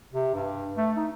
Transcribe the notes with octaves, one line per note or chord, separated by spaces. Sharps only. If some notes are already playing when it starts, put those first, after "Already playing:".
C3
G2
A3
D#4